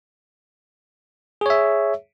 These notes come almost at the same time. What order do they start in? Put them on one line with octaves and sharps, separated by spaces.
G#4 C#5 E5